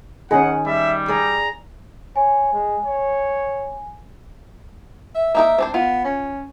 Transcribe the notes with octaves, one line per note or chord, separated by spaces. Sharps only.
D#3 C#4 G#4 F#5
G3 E5
G#4 D5 A#5
C#5 G#5
G#3
C#5
E5
A#3 D#4 A#4 E5
C4 D4 C5
B3 F4
C#4